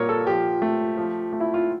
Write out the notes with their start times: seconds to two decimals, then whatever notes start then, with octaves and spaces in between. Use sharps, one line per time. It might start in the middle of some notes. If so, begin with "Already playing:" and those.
Already playing: A#2 G3 A#4 C#5
0.09 A4
0.27 F3 G4
0.62 A3
0.97 F3
1.33 A3
1.40 E4
1.54 F4